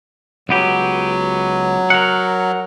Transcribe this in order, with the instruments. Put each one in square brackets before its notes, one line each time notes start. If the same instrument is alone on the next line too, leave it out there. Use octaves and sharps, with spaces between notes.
[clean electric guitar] C#2 B3 G4 [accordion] F#3
[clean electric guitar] A#4 F#5